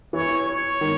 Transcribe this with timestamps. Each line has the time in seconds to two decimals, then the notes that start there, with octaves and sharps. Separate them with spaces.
0.13 E3 C#5
0.47 C#5
0.81 D#3